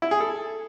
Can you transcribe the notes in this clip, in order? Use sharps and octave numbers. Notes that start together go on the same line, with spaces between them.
E4
G#4
A4